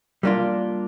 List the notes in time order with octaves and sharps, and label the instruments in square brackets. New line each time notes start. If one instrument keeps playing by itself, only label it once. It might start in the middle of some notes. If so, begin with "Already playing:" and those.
[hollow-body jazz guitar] G3 A#3 D4 F4